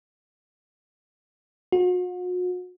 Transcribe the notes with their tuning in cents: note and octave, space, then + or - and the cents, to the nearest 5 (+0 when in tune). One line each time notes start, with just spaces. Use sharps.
F#4 -40